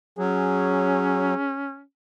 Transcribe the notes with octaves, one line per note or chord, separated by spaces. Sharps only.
F#3 C#4 G#4